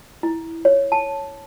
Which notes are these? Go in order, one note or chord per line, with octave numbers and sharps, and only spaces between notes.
E4
C#5
A5